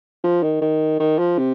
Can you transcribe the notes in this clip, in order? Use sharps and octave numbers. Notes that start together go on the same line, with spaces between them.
F3
D#3
D#3
D#3
F3
C3